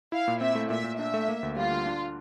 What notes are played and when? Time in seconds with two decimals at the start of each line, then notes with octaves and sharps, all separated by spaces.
0.12 E4 F5
0.28 A#2
0.41 C4 E5
0.55 A3
0.70 A#2 E5
0.84 A#2
0.99 D4 E5
1.14 A3
1.28 A#3
1.43 D2
1.56 G3 F4
1.71 D3
1.86 D4